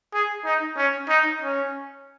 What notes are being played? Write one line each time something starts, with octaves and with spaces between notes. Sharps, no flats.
G#4
D#4
C#4
D#4
C#4